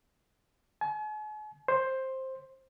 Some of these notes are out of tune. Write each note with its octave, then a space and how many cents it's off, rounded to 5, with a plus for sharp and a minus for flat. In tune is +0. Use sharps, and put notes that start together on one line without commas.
G#5 +45
C5 +10